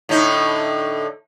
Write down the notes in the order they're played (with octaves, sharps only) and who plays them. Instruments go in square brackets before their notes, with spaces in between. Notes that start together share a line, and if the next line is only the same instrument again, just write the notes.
[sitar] A2 D3 D#4